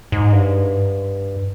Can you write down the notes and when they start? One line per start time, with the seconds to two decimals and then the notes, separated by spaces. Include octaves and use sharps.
0.12 G#2
0.32 G2